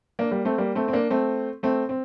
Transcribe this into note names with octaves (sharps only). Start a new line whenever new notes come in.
A#3 D4
G3 A#3
A3 C4
G3 A#3
A3 C4
C4
A#3 D4
A3 C4
A3 C4
C4